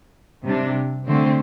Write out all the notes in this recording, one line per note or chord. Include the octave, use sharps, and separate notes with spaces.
C3 G3 D4
D3 A3 C4